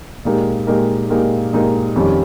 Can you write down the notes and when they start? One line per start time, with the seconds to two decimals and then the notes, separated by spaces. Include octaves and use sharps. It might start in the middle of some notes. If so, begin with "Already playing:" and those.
0.25 A#2 G#3 D#4 G4 A#4
0.67 A#2 G#3 D#4 G4 A#4
1.10 A#2 G#3 D#4 G4 A#4
1.53 A#2 G#3 D#4 G4 A#4
1.96 F2 D#3 G3 C#4